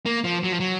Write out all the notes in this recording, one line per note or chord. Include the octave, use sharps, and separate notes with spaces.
A#3
F3
F#3
F3
F#3